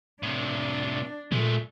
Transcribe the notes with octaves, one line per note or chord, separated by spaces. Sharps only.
A2 C3 D4
A#2 G#3 A3